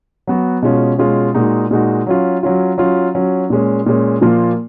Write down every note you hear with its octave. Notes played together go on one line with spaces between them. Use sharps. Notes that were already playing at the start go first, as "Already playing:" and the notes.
F#3 B3 F#4
B2 G#3 C#4 F4
B2 G#3 C#4 F4
A#2 G#3 D#4 F#4
A#2 G#3 D#4 F#4
F#3 C#4 F4
F#3 C#4 F4
F#3 C#4 F4
F#3 C#4 F4
A#2 G#3 C#4
A#2 G#3 C#4
A#2 F3 A#3 F4